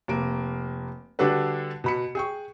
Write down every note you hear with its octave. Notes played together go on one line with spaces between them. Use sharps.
F1 A#3 D7
D3 G3 D4 F#4 A4 B4
B2 B5 C#7
G#4 G5 C#6